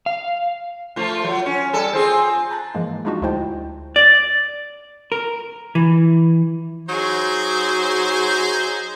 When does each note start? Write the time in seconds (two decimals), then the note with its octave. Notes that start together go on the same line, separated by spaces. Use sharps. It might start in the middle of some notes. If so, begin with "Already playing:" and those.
0.06 F5
0.96 F3 A3 F4
1.25 F#3
1.46 C#4
1.73 G3 A4
1.93 C4 F4 G#4
2.51 A5 A#5 F#6 A6
2.74 G#2 E3 F3 G#3 A#3
3.05 G#3 D4 D#4 F4 F#4
3.22 D2 G#3 E4 C5 G5 A5
3.96 D5
5.12 A#4
5.75 E3
6.89 F#3 D#4 G#4 C5